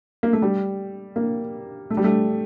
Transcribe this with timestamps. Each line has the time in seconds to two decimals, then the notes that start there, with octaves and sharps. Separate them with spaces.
0.23 A#3
0.33 A3
0.42 G3
1.16 A#3
1.90 A3
1.97 G3
2.04 A3